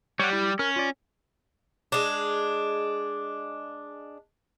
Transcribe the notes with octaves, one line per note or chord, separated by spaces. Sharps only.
G3 C#5 F#5
E4 G4
C#4 A#4
F4 D5
G#3 D4